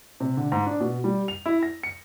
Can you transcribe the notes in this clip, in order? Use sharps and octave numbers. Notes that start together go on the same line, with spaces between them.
C3
D3
G#2
D4
B2
G3
F7
E4
A#6
C#7